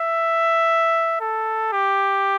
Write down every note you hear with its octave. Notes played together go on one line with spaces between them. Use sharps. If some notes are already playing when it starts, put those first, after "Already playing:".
Already playing: E5
A4
G4